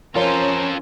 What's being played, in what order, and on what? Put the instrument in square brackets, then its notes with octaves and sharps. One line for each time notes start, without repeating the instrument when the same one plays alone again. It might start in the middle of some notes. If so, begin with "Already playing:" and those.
[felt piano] F3 A#4 C#5 [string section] C#4 [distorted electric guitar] F4 A4 [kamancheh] C5 A#5